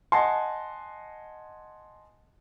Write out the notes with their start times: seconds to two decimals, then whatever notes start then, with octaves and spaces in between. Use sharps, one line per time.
0.12 D#5 F#5 G#5 A5 C6